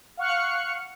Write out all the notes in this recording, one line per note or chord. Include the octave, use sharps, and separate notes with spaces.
F5 F#5 C#6 F6 F#6 C#7